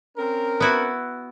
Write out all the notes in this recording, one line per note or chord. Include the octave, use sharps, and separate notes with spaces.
C4 C#4 A#4
B3 E4 F#4